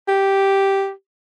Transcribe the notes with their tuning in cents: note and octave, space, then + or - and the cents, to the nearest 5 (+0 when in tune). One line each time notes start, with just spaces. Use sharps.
G4 -5